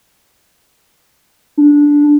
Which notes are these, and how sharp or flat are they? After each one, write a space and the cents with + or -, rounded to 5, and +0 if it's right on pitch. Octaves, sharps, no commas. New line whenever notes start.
D4 -10